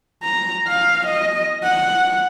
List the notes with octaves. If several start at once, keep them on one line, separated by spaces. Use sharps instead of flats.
A#5
F5
D#5
F#5